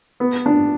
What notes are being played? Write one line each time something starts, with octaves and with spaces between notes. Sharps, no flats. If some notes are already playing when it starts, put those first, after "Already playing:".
B3
D4